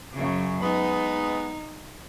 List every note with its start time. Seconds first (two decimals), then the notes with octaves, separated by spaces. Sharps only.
0.14 F#2 C#3
0.62 G#3 B3 D#4